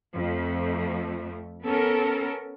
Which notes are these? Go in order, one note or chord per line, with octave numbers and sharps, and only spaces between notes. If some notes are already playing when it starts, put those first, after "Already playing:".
F2 A3
B3 C#4 A4 A#4